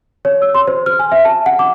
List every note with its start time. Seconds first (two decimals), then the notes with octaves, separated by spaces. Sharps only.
0.25 C#5
0.42 E6
0.54 C6
0.67 C5
0.86 F6
0.99 G#5
1.12 E5
1.25 A5
1.46 F#5
1.59 D6